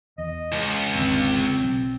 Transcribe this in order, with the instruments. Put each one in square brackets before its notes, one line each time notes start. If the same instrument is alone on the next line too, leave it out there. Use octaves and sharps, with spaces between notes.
[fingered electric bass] E2 [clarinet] D#5
[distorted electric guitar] C#2
[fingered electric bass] G#1 E2 D3 [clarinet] C4
[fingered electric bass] B1 F#3